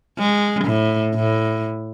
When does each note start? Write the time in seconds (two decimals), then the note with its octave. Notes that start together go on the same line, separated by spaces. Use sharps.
0.18 G#3
0.65 A2
1.14 A2